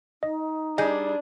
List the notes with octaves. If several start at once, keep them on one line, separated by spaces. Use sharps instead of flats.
D#4 D#5
G3 D4 G#4 D#5 G6